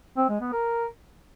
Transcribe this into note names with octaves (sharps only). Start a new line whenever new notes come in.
C4
G#3
B3
A#4